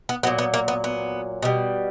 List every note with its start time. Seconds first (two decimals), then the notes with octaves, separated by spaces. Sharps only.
0.09 B3
0.23 A#2 F#3 B3
0.38 B3
0.54 A#3
0.68 B3
0.84 B3
1.42 B2 G3